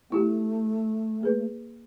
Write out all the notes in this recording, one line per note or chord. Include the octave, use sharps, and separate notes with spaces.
A3 B3 E4 G4
A#3 G#4 B4